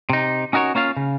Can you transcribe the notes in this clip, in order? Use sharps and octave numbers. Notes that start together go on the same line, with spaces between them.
C3 D#4
C#4 D#4 F#4 A#4 C#5
A#3 C#4 F4 F5
C#3